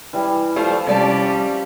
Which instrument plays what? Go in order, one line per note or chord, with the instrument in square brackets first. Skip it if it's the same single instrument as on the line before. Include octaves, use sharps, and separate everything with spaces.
[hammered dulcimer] E3 G3
[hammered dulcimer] F3 [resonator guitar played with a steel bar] G3 A3 F4
[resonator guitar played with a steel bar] C3 D5 A5 [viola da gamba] G3 C#4